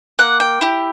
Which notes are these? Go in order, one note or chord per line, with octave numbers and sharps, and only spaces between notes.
A#3 F#5
G5
E4 G4